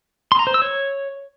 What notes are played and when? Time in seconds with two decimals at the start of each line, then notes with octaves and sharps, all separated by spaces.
0.32 C6
0.39 A#5
0.47 C5
0.54 E6
0.62 C#5